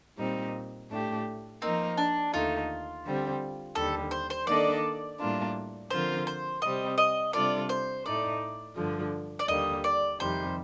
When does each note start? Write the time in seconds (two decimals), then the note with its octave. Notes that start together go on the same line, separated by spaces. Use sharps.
0.18 A#2 G3 C4 D#4
0.89 A2 A3 D4 G4
1.61 F3 A#3 C4 D#4 A#4
1.98 D4
2.33 D#2 D3 A3 D#4 F4
3.04 D3 G3 C4
3.75 D#2 D3 G3 A4
4.11 C5
4.30 C5
4.47 D#3 A#3 D4 A4 D5 D#5
5.19 A2 G3 A#3 D4 F4
5.90 D3 F3 C4 F4 A#4 C5
6.27 C5
6.62 C3 G3 C4 D#5
6.98 D#5
7.33 C3 G3 D4 F4 A4 D5
7.69 C5
8.05 A2 A3 D#4 D5
8.76 G2 D3 F3
9.39 D5
9.48 D#2 D3 G3 A#3 D#5
9.84 D5
10.20 F2 C3 D#3 G3 C5